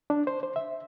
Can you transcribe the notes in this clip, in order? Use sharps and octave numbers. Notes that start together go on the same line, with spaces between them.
D4
C5
C5
E5